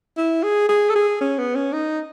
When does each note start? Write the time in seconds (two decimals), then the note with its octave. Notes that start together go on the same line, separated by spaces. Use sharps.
0.17 E4
0.43 G#4
0.69 G#4
0.89 A4
0.95 G#4
1.21 C#4
1.38 B3
1.56 C#4
1.73 D#4